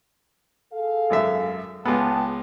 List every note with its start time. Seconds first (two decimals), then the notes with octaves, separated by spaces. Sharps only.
0.73 G#4 A4 F5
1.10 G#1 F#2 E5
1.85 C#2 B3 G#4 G5 A5